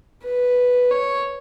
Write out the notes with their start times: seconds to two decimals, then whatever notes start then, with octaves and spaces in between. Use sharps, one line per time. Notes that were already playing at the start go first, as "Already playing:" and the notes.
0.23 B4
0.91 C#5